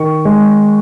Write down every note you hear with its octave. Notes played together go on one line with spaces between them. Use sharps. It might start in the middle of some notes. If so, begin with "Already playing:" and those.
Already playing: D#3 C#6
G#3